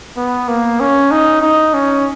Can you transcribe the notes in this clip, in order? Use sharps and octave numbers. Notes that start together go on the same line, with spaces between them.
B3
A#3
C#4
D#4
D#4
C#4